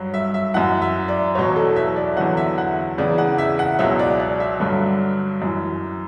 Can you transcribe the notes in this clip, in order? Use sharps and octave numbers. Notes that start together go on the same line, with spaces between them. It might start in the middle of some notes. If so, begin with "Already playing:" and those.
Already playing: G2 F#3
E5
E5
F#2 E3 F#5
E5
D5
E2 B2 F#3 C#5
A4
E5
D5
E2 D3 F#3 F#5
E5
F#5
E2 C#3 E3 D5
F#5
E5
F#5
C#2 B2 F#3 E5
D5
D5
E5
G2 D3 F#3
F#2 E3